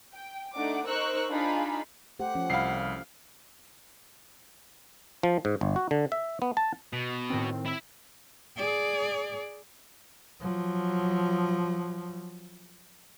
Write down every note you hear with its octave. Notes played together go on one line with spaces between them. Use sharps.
G5
A3 D4 D#4 F#5 D6
D#4 A#4 C5 C#6 E6 F#6
D4 D#4 F4 G#4 F5 B5
A3 G4 C5 F#5
F3 C#4
C2 F5 B5 C7
F3
G#2
G1
F#4
D3
E5
B3
A5
B2
A2 D#3 C4
E4 E5
G#4 D5
F3 F#3